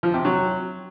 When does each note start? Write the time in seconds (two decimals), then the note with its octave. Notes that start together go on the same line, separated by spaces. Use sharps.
0.03 F3
0.14 C3
0.25 F#3